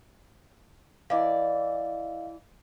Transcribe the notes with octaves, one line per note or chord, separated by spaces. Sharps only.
E3 E4 D5 D#5 F5